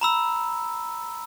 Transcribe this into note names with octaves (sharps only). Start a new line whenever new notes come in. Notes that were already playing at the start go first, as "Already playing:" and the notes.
A#5 B5 E6